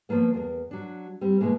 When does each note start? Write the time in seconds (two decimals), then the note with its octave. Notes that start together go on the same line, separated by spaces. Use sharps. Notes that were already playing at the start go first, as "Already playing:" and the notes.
0.09 F3 F#3 A#3 B3
0.34 E2 A#4
0.71 F#3 D4
1.21 G3 C4
1.40 B2 E3 G#3 A#3